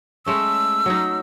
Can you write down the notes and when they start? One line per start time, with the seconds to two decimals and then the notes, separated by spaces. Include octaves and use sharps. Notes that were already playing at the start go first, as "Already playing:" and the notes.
0.26 G#3 A3 C#4 E6
0.86 F#3 D#4